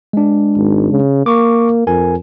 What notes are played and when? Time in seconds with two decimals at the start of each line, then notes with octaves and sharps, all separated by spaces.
0.13 G#3 D4
0.56 G#1
0.91 C#3
1.26 A#3 C#6 D6
1.87 F2 A#4 G#5